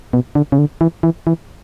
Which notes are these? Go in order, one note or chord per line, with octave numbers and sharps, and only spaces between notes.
B2
D3
C#3
D3
E3
E3
E3